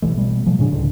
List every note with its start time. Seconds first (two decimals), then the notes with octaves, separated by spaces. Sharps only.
0.02 B1 E3 A3
0.17 B2 G3 A3
0.46 B2 F3 F#3
0.59 A2 C#3 D4
0.72 C#2 A2 D3